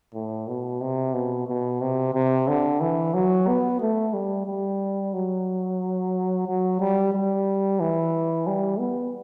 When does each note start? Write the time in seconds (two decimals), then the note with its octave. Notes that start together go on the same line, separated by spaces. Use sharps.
0.14 A2
0.48 B2
0.81 C3
1.14 B2
1.47 B2
1.81 C3
2.14 C3
2.48 D3
2.80 E3
3.14 F#3
3.48 B3
3.81 A3
4.14 G3
4.46 G3
5.13 F#3
6.47 F#3
6.80 G3
7.13 G3
7.80 E3
8.47 G3
8.79 B3